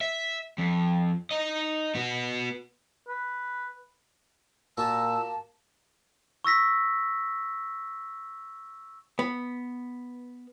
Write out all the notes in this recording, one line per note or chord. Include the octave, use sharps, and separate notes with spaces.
E5
F2
D#4 D#5
B3 F#4
B4
A#2 A#3 F#4 G4 A5 E6
C#6 E6 A#6 B6
B3